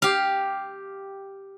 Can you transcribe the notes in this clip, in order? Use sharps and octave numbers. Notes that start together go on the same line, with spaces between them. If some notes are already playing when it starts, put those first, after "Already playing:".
G4 F5